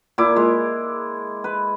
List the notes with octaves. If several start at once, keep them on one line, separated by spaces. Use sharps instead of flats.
A#2 E4 D6
G#3
B4